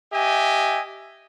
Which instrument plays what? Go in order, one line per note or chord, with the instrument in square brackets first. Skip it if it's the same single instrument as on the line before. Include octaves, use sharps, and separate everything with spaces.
[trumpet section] G4 D#5 E5 G#5